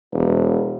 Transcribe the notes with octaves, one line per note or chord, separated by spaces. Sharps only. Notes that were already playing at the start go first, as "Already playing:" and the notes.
E1